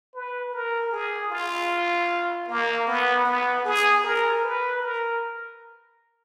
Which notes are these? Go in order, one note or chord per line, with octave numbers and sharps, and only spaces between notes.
B4
A#4
G#4
F4
A#3
B3
B3
G#4
A#4
B4
A#4